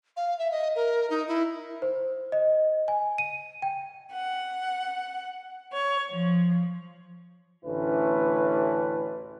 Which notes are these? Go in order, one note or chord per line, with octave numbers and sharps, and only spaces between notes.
F5
E5
D#5
A#4
D#4
E4
C5
D#5
G#5
D#7
G5
F#5
C#5
F3
A1 D2 C#4 E4 B4